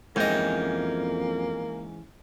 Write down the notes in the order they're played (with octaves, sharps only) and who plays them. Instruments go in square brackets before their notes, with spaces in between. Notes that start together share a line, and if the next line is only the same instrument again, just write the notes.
[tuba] F2 [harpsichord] G#2 D#5 [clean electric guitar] E3 C#4 G5 [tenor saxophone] A#3